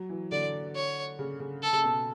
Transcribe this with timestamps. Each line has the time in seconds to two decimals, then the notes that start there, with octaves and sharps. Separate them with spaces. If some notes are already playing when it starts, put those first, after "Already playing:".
Already playing: F#3
0.09 E3
0.32 D3 D5
0.75 C#5
1.19 C#3
1.40 C#3
1.62 A4
1.73 C#3
1.84 B2